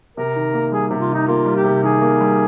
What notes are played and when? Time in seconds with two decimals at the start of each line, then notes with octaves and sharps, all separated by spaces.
0.17 C3 A#4
0.36 D#3
0.54 A#3
0.72 G3 G#4
0.91 C3
1.00 F4
1.09 D#3 D#4
1.27 A#3 F4
1.46 G3
1.56 G4
1.65 C3
1.83 D#3 G#4
2.02 A#3
2.21 G3